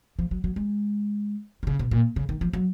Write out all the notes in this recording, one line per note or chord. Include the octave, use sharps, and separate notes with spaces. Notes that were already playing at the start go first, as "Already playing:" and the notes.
F3
F#3
F#3
G#3
D#3
C#3
B2
A#2
C#3
D#3
F3
F#3